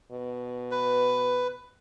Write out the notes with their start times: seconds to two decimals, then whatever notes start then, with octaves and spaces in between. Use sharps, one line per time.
0.12 B2
0.71 B4